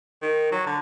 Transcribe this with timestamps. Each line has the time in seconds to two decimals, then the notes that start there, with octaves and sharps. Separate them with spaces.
0.22 D#3
0.52 F#3
0.66 D3